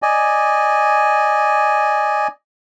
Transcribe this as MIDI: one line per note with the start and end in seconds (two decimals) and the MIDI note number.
0.02 2.28 74
0.02 2.28 75
0.02 2.28 80